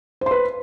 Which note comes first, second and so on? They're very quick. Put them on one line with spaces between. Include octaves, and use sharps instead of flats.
C5 C6 B4